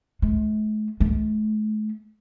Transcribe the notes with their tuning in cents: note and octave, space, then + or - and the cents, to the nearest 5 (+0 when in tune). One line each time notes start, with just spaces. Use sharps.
A3 -45
A3 -45